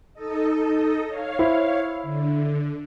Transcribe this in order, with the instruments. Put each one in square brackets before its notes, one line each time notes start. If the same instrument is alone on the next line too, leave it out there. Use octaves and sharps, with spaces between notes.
[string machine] D#4 A4 D#5
C#5 F5
[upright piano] E4 C5
[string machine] D3